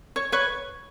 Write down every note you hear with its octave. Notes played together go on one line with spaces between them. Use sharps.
C#5
B4 C#5